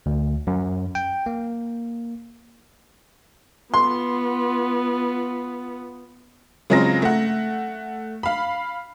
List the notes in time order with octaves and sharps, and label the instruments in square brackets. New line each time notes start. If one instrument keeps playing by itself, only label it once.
[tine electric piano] D2
F#2
G5
A#3
[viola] B3 F4 [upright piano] C6
[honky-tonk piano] C#3 F#3 G#3 C4 F4 A#6
A3 F#5
F5 B5